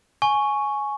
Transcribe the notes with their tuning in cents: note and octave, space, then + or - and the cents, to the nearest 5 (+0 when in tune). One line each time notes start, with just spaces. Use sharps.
G#5 +15 C#6 +0